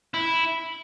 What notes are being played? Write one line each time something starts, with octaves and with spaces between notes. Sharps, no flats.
E4